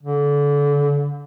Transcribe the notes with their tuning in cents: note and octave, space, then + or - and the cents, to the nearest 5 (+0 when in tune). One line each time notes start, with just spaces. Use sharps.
D3 -30